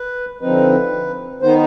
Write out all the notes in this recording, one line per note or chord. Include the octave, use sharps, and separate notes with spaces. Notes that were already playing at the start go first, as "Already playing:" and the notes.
Already playing: B4
D3 F3 C4 D#4 B4
D#3 B3 D#4 C5